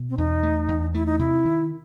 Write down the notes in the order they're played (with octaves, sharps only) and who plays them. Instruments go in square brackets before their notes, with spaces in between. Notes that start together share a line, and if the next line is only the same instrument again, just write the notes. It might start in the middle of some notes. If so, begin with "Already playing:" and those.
Already playing: [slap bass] B2
[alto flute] C4
[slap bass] E2 [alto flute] D#4
[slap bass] A3
E2
[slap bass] A3 [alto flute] E4
[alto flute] D#4
[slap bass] C3 [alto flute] E4
[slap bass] D#3